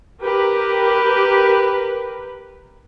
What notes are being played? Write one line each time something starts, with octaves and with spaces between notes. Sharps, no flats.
G4 A#4 B4